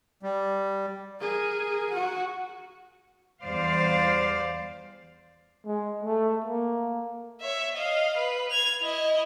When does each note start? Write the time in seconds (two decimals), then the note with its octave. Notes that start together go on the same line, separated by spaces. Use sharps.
0.23 G3
1.20 G#4 A#4
1.90 F#4 F#5
3.43 E2 G3 C5 D5 F5
5.66 G#3
6.03 A3
6.45 A#3
7.41 C#5 E5
7.75 D#5 F5
8.18 B4
8.50 G#6 F7
8.82 E4 D#5